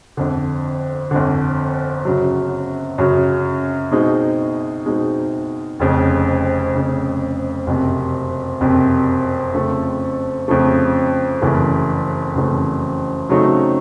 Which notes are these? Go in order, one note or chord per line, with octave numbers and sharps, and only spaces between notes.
G1 F2 D3
G1 F2 D3
F#2 C#3 F#3
F#2 C#3 F#3
B2 G#3 C4 D#4
B2 G#3 C4 D#4
F1 F2 C#3
F1 F2 C#3
F#1 F2 C3
F#1 F2 C3
F2 C#3 F3 A3
F2 C#3 F3 A3
F#1 F2 C#3 E3 A3
F#1 F2 C#3 E3 A3
C#3 F#3 A3 C4 D#4